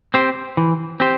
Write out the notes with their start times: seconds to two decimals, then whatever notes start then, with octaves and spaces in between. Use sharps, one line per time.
0.14 C4 G4 C5
0.57 E3
1.00 C4 G4 C5